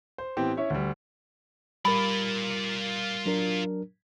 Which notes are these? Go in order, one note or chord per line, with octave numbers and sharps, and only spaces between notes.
C5
A2 E3 B3 C4 G4
C#4 E4 C#5 E5
D2 G3
G3 F4 A#4 D5 B5
F#3 D4 A#4